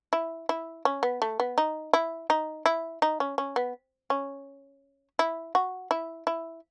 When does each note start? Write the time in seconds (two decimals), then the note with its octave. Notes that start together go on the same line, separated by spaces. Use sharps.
0.13 E4
0.49 E4
0.85 C#4
1.03 B3
1.22 A3
1.40 B3
1.58 D#4
1.93 E4
2.30 D#4
2.66 E4
3.02 D#4
3.20 C#4
3.38 C#4
3.56 B3
4.10 C#4
5.19 E4
5.55 F#4
5.91 E4
6.27 E4